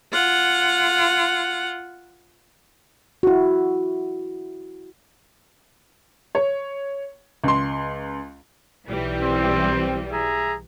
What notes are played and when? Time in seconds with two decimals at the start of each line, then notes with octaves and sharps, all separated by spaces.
0.13 F4 F#5
3.23 E4 F#4
6.35 C#5
7.44 C#2 C6
8.89 B1 E3 G3
9.21 C4
10.12 G#4 E5 A#5